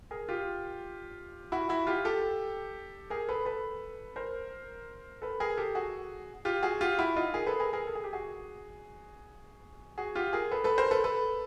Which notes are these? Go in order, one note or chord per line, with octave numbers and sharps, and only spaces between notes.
G#4 A#4
F4 G4
E4 F#4
E4 F#4
F4 G4
G4 A4
G#4 A#4
A4 B4
A4 B4
A#4 C5
A4 B4
G#4 A#4
G4 A4
F#4 G#4
F4 G4
F#4 G#4
F4 G4
E4 F#4
D#4 F4
G#4 A#4
A4 B4
G#4 A#4
G#4 A#4
A4
G#4
G4
F#4 G#4
F#4 G#4
F4 G4
G#4 A#4
A4 B4
A4 B4
A#4 C5
A4 B4
A4 B4